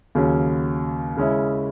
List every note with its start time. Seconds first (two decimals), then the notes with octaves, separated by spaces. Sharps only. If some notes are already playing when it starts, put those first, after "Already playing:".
0.15 D#2 C#3 F#3 C#4
1.17 C#3 G#3 C#4 E4